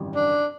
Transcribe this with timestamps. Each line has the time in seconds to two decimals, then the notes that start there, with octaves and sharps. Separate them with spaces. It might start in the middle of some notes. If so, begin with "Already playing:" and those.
Already playing: G#1 F#2 C#3 E3 G3
0.15 D4